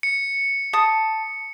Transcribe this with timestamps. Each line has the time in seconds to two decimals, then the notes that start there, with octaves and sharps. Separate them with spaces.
0.03 C#7
0.73 A5 D#6